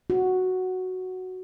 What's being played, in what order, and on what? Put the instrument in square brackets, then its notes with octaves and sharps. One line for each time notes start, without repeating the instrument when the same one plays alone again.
[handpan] F#4